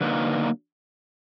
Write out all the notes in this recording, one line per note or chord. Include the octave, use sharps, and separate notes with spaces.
D3 F#3 A#3 D#4 B4